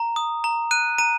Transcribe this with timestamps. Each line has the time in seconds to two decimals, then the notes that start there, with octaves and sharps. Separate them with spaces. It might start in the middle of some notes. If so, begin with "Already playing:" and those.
Already playing: A#5
0.16 D#6
0.44 A#5
0.71 F#6 D#7
0.98 A#5 D#7